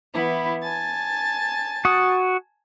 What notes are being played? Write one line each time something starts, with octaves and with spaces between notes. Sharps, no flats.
E3 B3 E4
G#5 A5 A6
F#4 D#6